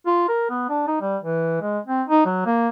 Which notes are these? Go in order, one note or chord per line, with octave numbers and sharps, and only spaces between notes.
F4
A#4
B3
D4
D#4
G3
E3
G#3
C4
D#4
F#3
A#3